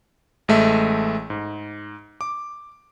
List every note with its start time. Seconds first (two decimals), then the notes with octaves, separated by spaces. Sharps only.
0.48 A1 G#3 A3 E5
1.30 G#2
2.21 D6